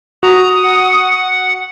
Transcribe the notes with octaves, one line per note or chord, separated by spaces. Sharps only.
F#4 A#5 D#6
F#5